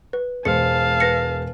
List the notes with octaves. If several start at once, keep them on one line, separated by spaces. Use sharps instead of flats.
B4
E1 G#3 C5 F5 A5 C#7
B4 A#6 C#7